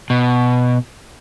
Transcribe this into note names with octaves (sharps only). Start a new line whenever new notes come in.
B2